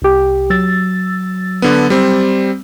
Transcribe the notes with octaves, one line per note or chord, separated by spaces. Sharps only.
C2 G4
F#3 E6 A6
D3 B3
G3 C4